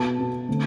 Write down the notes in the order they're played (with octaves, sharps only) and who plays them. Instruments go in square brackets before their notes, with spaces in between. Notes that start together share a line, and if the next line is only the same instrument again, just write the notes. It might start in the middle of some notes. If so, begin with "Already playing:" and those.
Already playing: [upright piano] B2 B3 A5
B2 B3
D3 A3 C4